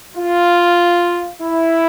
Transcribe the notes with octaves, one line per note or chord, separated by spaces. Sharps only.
F4
E4